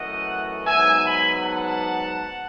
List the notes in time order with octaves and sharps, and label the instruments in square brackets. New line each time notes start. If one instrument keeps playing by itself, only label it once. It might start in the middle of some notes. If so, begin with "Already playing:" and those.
Already playing: [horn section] F#2 E3 A3 D#5 F#5
G#2 F#3 B3 E5 G#5
G#5 B5
F#5 A5